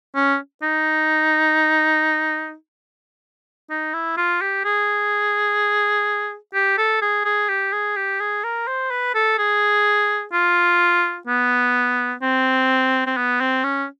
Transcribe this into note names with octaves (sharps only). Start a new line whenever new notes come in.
C#4
D#4
D#4
E4
F4
G4
G#4
G4
A4
G#4
G#4
G4
G#4
G4
G#4
A#4
C5
B4
A4
G#4
F4
B3
C4
C4
B3
C4
C#4